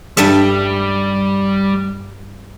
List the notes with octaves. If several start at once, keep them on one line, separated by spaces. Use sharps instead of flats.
G2 G3 A4 E5